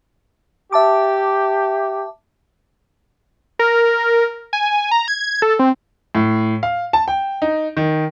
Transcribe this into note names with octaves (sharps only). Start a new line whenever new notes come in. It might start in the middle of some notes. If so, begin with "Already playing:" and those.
G4 E5 A5 D6
A#4
G#5
A#5
G#6
A4
C4
A2
F5
A5
G5
D#4
D#3